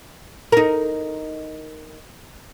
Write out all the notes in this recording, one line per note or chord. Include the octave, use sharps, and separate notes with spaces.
D#4 A#4